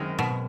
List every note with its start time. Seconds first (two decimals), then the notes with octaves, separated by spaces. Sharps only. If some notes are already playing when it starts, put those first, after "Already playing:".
Already playing: F#2 D#3 G#3 C4
0.19 B2